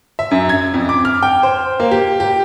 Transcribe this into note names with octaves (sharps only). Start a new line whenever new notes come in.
E5
F#2
G#6
F2
D6
F6
G5
C5
A#3
G4
G4